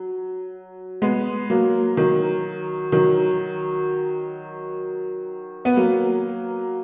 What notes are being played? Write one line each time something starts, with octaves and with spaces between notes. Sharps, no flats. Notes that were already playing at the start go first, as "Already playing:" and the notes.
Already playing: F#3
G#3 B3
F#3 A#3
D#3 F#3
D#3 F#3
B3
F#3 A#3